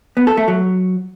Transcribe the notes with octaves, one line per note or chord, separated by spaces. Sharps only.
B3
A4
A3
F#3